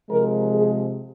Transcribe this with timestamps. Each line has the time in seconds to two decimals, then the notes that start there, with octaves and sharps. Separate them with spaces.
0.10 C3 F3 G#3 A#4
0.54 G#4